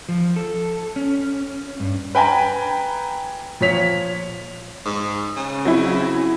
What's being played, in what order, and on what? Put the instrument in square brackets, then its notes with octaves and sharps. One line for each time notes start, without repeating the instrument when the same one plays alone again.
[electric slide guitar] F3
A4
C#4
G2
[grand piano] B4 G5 G#5 A#5 B5
A#2 F3 C#5 B6 F7
[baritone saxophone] G#2
C#3
[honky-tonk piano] F#3 C4 E4